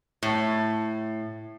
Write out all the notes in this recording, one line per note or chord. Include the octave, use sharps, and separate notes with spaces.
A2